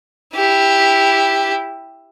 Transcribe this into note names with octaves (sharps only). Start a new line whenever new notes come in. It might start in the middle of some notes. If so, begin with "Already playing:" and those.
E4 G4